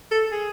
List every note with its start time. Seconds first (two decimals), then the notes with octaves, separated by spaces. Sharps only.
0.12 A4
0.32 G#4